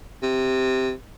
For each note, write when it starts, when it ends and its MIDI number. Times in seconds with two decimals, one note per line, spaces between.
0.23 0.92 48